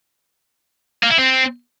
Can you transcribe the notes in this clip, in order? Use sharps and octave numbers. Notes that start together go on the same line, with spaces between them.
A#3
E4
C4